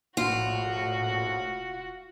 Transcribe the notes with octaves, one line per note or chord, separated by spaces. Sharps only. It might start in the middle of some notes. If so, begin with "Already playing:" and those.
E1 A#1 A2 F4 F#4